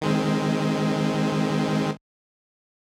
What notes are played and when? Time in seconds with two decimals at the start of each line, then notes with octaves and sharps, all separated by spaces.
0.01 D#3 G#3 C4